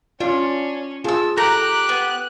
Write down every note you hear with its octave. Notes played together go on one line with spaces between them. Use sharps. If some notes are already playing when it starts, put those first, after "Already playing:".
C#4 D4 F4 D5
F4 G#4 A5 E6
G4 A4 A#5 F#6
B3